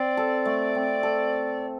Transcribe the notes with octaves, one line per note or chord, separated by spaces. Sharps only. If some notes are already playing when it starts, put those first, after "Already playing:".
Already playing: C4 C5 D5
A4
A3
C4
A4